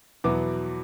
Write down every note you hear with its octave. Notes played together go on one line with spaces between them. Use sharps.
E2 B2 F#3 B3 E4 D6